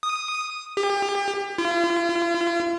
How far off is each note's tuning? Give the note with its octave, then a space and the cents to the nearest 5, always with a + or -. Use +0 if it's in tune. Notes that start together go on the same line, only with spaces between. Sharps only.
D#6 -5
G4 +35
F4 -40